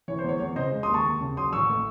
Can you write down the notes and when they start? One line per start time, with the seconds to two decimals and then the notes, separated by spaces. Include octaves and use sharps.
0.08 E3 C#5
0.19 C5
0.24 E2 C#5
0.40 E2 C#5
0.56 C#3 C5 D#5
0.72 G#3
0.83 C6 D#6
0.88 D#2
0.94 A5 C#6
1.05 D#2
1.21 C#3
1.37 F#3 C6 D#6
1.53 A1 C#6 E6
1.69 A3